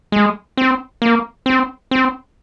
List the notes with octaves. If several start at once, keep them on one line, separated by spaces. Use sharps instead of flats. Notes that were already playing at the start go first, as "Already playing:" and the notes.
G#3
C4
A#3
C4
C4